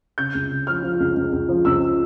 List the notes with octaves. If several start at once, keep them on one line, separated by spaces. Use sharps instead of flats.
C#3 G6
C#2
C#3
F3 F6
F3
C#2
C#2
C#2
F3
C#2 E6